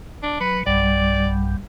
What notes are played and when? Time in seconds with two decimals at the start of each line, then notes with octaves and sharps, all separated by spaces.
0.23 D4
0.41 F#3 B4
0.67 B1 G2 G3 D5